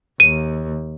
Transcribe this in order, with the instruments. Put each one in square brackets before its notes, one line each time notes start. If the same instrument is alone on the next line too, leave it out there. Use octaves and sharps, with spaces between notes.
[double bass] D#2 [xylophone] D#7